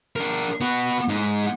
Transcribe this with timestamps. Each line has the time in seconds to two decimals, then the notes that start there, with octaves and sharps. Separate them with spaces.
0.16 D4 A#4
0.61 B3 F#4
1.08 G#2